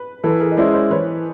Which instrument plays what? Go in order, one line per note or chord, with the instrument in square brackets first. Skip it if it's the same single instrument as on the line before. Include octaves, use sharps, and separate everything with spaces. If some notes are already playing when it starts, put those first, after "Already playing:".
Already playing: [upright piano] B4
[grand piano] E3 [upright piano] A4 B4
[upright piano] G#4 A#4
D#5
[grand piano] G#3 C#4 E4 [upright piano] C5 D5
[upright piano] C5 D5
[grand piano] E3 [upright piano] B4 C#5